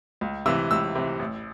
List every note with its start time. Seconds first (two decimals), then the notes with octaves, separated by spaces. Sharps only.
0.21 C#2
0.46 C3 E3 E6
0.71 C#2 E6
0.95 C3 E3
1.20 A1